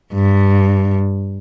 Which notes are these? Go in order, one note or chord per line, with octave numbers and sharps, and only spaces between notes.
G2